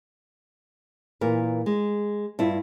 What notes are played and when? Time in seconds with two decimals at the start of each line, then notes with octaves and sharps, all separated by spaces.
1.21 A#2 E3 A#4 B4
1.66 G#3
2.39 G2 E4 F4